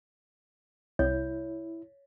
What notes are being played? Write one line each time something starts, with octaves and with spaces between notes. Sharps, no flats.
C2 E4 C#5